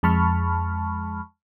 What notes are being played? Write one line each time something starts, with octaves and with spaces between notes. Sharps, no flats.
F2 G#3 A5 B5 C#6 F6